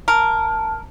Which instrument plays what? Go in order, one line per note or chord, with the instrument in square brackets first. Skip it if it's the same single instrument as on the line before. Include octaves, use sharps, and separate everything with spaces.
[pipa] A#4 [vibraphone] A5